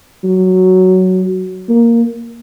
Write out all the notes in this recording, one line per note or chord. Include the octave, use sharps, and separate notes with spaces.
F#3
A#3